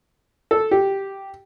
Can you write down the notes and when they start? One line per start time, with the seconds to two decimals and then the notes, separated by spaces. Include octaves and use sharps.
0.51 A4
0.71 G4